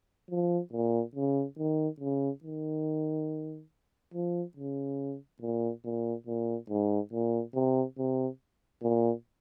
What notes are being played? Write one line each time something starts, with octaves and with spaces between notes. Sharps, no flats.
F3
A#2
C#3
D#3
C#3
D#3
F3
C#3
A#2
A#2
A#2
G#2
A#2
C3
C3
A#2